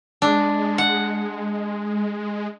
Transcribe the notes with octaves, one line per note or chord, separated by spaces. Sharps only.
G#3 D4
F#5